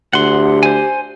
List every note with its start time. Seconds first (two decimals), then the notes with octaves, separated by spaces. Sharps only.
0.13 D2 G4 F#5 C6
0.63 C5 G#5